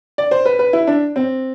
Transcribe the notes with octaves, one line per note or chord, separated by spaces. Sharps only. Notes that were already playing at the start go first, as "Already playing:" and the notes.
D5
C5
B4
B4
E4
D4
C4